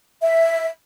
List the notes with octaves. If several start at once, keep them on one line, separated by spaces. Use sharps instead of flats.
E5